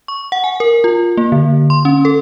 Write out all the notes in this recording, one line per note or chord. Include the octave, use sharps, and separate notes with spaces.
C#6
F#5
G#5
A#4
F4
A#3
D3
C6
C#4
A4